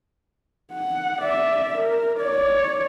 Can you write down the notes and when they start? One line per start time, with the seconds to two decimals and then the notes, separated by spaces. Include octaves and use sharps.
0.73 F#5
1.21 D5 E5
1.77 A#4
2.19 C#5 D5